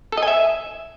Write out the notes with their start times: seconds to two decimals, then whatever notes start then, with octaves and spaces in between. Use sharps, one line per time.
0.12 A4
0.17 D#5
0.23 G#5
0.28 E5